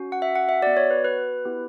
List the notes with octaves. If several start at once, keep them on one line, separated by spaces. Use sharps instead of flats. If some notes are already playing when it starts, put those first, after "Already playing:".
Already playing: C#4 F#4
F#5
E5
F#5
E5
B3 F#4 D5
C#5
B4
B4
B3 E4 G4